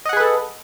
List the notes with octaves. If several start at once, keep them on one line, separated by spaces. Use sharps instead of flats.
G#4 A4 B4 D#5 F#5